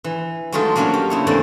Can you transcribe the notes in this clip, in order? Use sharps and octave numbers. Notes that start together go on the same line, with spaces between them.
E3
F#3 G#3 A3 D#4 F4
F#3 A#3 C#4 D4 C#5
G4
C#3 E4 C#5
E2 A2 A#3 C4 D5 B5